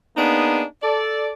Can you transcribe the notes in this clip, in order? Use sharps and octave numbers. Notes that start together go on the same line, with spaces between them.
A#3 B3 D4 D#4 G#4
A4 D5